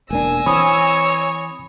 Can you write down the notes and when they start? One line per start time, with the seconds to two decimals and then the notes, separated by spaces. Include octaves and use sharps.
0.11 E1 A#3 D4 G#5 E6 A#6
0.46 E3 C4 C#5 B5 D#6